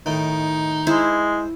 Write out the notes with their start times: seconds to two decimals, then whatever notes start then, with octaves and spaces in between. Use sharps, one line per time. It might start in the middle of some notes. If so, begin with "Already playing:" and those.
0.06 A2 D#3 D#4
0.87 G#3 E4 C5